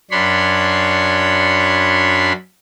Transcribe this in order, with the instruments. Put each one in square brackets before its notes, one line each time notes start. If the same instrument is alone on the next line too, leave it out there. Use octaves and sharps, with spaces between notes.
[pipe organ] F#2 D4 C#5 B5 C6